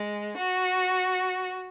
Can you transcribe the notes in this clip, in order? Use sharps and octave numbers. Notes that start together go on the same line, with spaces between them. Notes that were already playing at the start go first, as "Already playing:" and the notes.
Already playing: G#3
F#4